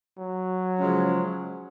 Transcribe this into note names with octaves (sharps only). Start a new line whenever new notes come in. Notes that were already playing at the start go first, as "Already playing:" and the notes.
F#3
C#3 F3 G#3 C#4